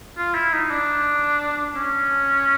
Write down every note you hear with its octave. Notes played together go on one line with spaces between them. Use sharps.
F4
E4
D#4
D4
C#4